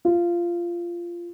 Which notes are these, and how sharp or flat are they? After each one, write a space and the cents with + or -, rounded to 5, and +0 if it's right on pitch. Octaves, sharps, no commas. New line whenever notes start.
F4 -15